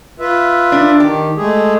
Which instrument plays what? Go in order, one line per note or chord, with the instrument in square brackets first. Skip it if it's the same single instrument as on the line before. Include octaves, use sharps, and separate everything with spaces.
[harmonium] F4 B4 E5
[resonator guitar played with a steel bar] D4
[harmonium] D#3 [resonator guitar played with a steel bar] G4
[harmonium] G#3 A3 G#4